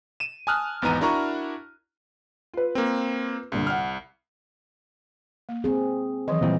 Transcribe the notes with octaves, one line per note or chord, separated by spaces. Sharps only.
D#7 E7
G#5 A5 D#6 F6 F#6
G#1 E2 B3 D#4 A#5 D#7
D4 E4 F#4 A#4 A#5 C#6
F4 B4
A#3 C4
C2 G2 A#2 D3
F#5 F6
A#3
C4 G#4
D#3 E3 F#3 D#5
A#2 E3 G3 C4